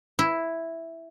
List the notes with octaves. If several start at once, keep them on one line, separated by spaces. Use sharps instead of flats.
E4